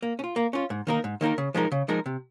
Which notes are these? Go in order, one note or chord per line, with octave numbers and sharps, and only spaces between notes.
A#3
C#4
F4
A#3
C#4 F4
G#2
D#3 A#3 D#4 A#4
G#2
D#3 A#3 D#4 A#4
C#3
F3 G#3 D#4 A#4
C#3
F3 G#3 D#4 A#4
C3